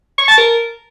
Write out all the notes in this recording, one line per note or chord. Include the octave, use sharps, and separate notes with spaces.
C#6
A5
A#4